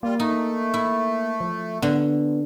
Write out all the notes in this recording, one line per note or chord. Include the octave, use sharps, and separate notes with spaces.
G3 A#3 F4
A3 D#4
E4
F3
D3 B3